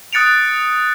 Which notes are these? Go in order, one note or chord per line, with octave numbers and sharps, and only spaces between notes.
D#6 F#6 A6 C#7 D7 F7